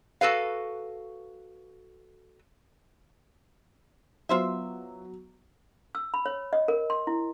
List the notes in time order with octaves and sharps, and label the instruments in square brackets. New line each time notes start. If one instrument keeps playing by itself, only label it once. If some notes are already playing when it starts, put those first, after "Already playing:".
[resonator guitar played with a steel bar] F#4 A4 B4 F5
[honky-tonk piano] F#3 B3 [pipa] F4 C5 E5
[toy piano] E6
B5
C#5
D#5
A#4
C6
E4